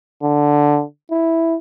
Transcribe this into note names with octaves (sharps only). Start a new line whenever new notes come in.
D3
E4